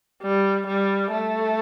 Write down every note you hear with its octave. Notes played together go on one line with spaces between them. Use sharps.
G3
G3
A3